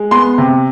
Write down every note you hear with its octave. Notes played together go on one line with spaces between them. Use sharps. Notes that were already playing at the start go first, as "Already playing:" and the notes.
Already playing: G#3
B3 C6
C3